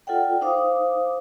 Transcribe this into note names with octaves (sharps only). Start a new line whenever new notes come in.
F4 A4 D5 F#5 G5
D#4 C5 F5 D6 D#6